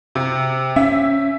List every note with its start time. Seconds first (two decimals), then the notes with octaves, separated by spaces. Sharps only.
0.15 C3
0.76 C#4 E5